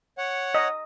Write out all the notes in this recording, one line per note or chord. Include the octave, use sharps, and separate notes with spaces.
C#5 F#5
D#5